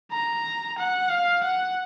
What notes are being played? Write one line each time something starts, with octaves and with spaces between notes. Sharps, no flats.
A#5
F#5
F5
F#5